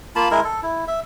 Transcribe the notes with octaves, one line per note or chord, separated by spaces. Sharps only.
A#3 F4 A5 B5
G#3 E4 A#4
A4
E4
E5